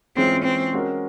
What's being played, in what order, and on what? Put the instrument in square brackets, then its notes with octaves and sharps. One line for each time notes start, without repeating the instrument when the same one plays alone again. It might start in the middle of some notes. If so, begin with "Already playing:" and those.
[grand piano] E3 G#3 C#4 F4 G#4 [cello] C4
[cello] C4
[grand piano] G#3 C#4 F#4 A#4